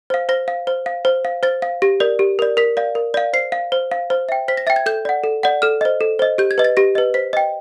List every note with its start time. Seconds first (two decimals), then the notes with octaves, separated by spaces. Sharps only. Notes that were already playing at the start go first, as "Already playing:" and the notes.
0.10 C5 F5
0.29 C5 A#6
0.48 F5
0.67 C5
0.86 F5
1.05 C5
1.25 F5
1.43 C5 A6
1.62 F5
1.82 G4 A#6
2.00 A#4 D5
2.19 G4
2.39 A#4 D5
2.57 A#4 B6
2.77 D5 F5
2.95 A#4
3.14 D5 F5
3.33 C5 C7
3.52 F5
3.72 C5
3.91 F5
4.10 C5
4.29 E5 G5
4.48 C5 B6
4.57 A#6
4.67 E5 A6
4.70 G5
4.76 G#6
4.86 A4 G6
5.05 D5 F#5
5.24 A4
5.43 D5 F#5
5.62 A4 F6
5.81 C5 D#5
6.01 A4
6.19 C5 D#5
6.38 G4 G6
6.51 G#6
6.58 B4 D#5
6.64 A6
6.77 G4 A#6
6.95 B4 D#5
7.14 C5 B6
7.33 D#5 G5